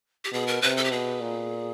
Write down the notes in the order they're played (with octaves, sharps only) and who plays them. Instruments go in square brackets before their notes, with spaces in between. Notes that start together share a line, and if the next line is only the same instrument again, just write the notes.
[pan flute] G4
[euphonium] B2 [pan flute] G#4
[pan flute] A#4
[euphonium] C3 [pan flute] B4
[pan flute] A4
G4
[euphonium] B2 [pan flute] G#4
[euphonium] A#2